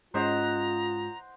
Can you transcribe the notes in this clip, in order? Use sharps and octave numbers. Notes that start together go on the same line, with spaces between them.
G#2 G#3 C#4 F4 C5 D#5 F#5 A#5